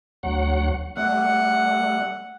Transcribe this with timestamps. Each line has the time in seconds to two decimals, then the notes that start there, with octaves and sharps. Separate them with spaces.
0.23 D2 F#3 F#5
0.97 G3 A3 F#5